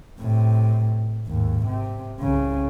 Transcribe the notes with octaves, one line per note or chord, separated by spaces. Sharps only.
A2 C3
G#1 D#2
C3
C2 C#3